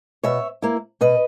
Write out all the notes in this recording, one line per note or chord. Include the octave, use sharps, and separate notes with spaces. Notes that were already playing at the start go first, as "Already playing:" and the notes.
B2 C#5 E5
A#3 E4
B2 B4 D#5